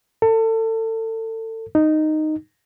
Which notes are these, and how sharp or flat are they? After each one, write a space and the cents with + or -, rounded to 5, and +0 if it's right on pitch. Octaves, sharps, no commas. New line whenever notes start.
A4 +30
D#4 -10